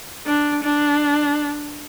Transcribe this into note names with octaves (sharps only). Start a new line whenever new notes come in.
D4
D4